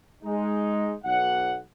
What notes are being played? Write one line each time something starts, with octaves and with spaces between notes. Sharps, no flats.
G#3 D#4
B1 F#5